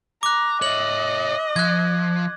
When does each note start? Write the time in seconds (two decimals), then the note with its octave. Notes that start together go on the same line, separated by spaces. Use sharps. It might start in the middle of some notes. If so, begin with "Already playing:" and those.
0.23 A#5 D6 F#6
0.62 C#5 D#5 E5 F#7
1.56 F3 F#6 G#6